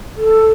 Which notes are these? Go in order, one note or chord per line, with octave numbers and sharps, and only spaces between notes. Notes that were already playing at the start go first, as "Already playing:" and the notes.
A4